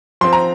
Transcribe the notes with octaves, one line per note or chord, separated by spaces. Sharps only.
F3 C4 C6
A#5